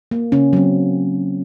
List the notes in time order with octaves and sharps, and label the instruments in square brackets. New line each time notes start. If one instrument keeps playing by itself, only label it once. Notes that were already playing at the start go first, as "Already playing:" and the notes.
[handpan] A#3
C#3 C#4
F#3 C4